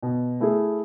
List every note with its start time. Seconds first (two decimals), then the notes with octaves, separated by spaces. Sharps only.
0.03 B2
0.40 A3 E4 G#4